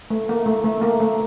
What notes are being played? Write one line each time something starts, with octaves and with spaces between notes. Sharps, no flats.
A3
A#3
A3
A3
A#3
A3